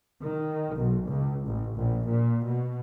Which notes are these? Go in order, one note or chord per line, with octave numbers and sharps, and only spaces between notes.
D#3
B1
C#2
A1
A#1
A#2
B2